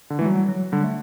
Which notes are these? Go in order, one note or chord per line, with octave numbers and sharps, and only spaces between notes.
D3
E3
A3
F#3 G3
F#3
D3 G3
A3